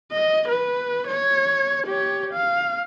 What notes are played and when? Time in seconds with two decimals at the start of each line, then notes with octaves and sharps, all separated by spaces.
0.12 D#5
0.48 B4
1.07 C#5
1.87 G4 C#5
2.33 F5